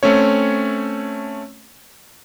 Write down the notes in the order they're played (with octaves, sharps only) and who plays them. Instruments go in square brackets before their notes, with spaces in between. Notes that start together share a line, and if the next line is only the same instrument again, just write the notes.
[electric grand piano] A3 C4 C#4 C#5